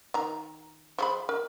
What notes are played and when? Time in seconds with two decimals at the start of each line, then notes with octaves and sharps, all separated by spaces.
0.14 D#3 A#5
0.99 F3 G#4 B5
1.29 A#4